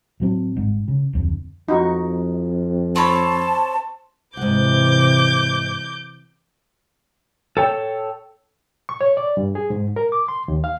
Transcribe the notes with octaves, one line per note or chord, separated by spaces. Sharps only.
A2 F#3 C4
G1 G#2
C#3
D1 F2 D3
F2 D#4 F#4 C#6
C4 C#5 A5 B5
G#2 C3 E3 F#5 D6 G6
A4 C#5 G5
C#6
C#5
D5
G2
G#4
G#2
A#4
D6
C6
D#2
F5